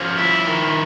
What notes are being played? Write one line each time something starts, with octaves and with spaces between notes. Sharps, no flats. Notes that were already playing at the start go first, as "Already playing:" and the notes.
Already playing: F3 C#4
E4
D#3